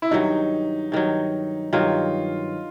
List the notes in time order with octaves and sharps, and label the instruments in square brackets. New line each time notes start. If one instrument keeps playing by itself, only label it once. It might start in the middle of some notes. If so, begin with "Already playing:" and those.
[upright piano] E4
[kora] G2 D#3 F#3 [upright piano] D#4
[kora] G2 D#3 F#3
[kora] G2 D#3 F#3 [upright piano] F4